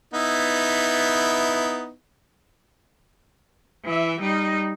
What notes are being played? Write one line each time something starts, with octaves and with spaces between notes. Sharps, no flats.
B3 D#4 E4
E3 E5
G3 D#4